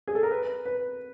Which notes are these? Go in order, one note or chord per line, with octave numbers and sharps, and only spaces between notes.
G#4
A4
A#4
B4
B4